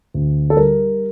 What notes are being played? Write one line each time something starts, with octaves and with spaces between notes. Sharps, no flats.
D2
A4
G3 A#4